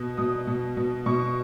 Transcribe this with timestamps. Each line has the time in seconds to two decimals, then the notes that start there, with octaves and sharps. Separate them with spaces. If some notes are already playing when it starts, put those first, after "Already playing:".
Already playing: B2
0.17 B2 D#6
0.47 B2
0.77 B2
1.06 B2 C#6